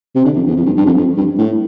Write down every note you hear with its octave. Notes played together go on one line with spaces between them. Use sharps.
C3
D3
F2
E2
F2
G2
G2
F2
F2
G2
A2